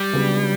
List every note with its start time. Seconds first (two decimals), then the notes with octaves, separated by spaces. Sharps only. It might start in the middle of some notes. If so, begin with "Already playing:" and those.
Already playing: G3
0.13 C#3 F#3 B3 D4